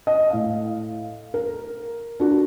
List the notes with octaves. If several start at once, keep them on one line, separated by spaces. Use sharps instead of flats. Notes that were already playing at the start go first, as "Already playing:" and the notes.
D#5
A2 F5
A#4
D4 F#4